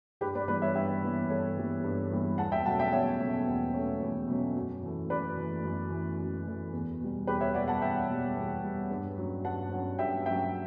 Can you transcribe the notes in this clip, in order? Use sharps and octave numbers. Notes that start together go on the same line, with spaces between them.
G2 G4 B4
B4 D5
E3 G3 B3 B4 D5
C#5 E5
G2 E5 G5
E3 G3 B3
G2 A4 C#5
E3 G3 B3
G2
E3 G3 B3
E2 F#5 A5
E5 G5
B2 F#3 A3 C#4 F#5 A5
E5 G5
E2 C#5 E5
B2 F#3 A3 C#4
E2
B2 F#3 A3 C#4
E2
B2 F#3 A3 C#4
F#2
E3 A3
F#2 B4 D5
E3 A3
F#2
E3 A3
F#2
E3 A3
E2
B2 G3
E2 G4 B4
C#5 E5
B2 G3 D5 F#5
F#5 A5
E2 E5 G5
B2 G3
E2
B2 G3
G2
F#3 C#4
G2 F#5 A5
F#3 C#4
G2 E5 G5
F#3 C#4 E5 G5